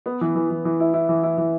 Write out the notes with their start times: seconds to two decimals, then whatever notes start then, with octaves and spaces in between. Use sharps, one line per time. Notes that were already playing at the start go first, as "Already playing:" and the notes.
0.06 B3
0.21 E3
0.35 E3
0.50 E3
0.65 E3
0.80 E4
0.94 E4
1.09 E3
1.23 E4
1.38 E3